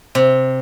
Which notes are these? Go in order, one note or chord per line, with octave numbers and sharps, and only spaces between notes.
C3